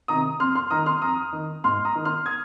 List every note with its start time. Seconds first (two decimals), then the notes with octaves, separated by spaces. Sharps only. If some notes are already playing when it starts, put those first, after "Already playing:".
0.08 C3 D#3 A#5 D#6
0.40 F2 C6 F6
0.55 C6 F6
0.70 D#3 A#5 D#6
0.86 C6 F6
1.02 F2 A#5 D#6
1.32 D#3
1.64 G#2 C6 F6
1.85 A#5 D#6
1.95 D#3
2.05 C6 F6
2.26 D#6 G#6